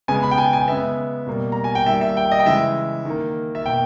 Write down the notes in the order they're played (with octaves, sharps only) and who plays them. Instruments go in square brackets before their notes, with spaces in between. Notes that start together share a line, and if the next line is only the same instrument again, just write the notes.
[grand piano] C#3 G#3 B3 G#5
B5
G5
G#5
G#5
C#3 G#3 B3 E5
B2 G3 A#3
A#5
G#5
G5
D#3 G3 A#3 E5
E5
G5
D#5
G5
C#3 E3 G#3 E5
D#3 A#3
E5
B2 A#3 G5